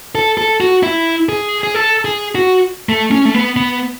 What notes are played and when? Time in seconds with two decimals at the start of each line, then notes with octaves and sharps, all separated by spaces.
0.15 A4
0.38 A4
0.60 F#4
0.83 E4
1.29 G#4
1.63 G#4
1.74 A4
2.05 G#4
2.35 F#4
2.89 A3
3.11 C#4
3.25 A3
3.34 B3
3.56 B3